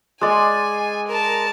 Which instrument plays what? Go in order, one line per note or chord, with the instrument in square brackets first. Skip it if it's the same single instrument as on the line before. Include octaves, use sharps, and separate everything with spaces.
[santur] G#3 D5 C6 [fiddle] G#5
[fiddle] A#4 A5